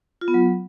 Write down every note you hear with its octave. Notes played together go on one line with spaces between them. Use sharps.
F4
B3
F#3